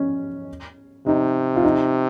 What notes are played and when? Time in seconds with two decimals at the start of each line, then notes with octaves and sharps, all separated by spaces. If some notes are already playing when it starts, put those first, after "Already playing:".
Already playing: C#4
1.06 C3 D#4
1.56 F4
1.64 D#4